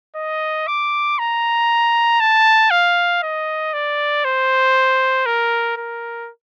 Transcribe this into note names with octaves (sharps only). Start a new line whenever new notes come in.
D#5
D6
A#5
A5
F5
D#5
D5
C5
A#4
A#4